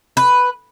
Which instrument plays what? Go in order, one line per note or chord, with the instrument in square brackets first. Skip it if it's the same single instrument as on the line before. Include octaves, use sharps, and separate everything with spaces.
[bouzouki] B4